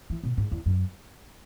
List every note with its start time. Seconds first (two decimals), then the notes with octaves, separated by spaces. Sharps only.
0.10 E3
0.23 B2
0.38 G#2
0.51 E2
0.66 F#2